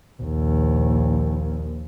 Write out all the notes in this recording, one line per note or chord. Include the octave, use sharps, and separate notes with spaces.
A#1 D#2